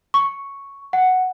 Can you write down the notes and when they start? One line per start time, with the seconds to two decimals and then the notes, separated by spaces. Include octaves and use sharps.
0.14 C#6
0.93 F#5